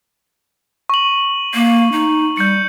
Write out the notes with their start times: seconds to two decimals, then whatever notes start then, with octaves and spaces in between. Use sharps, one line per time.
0.89 C#6 F#7
1.55 A#3
1.92 D#4
2.37 G3 G6 C#7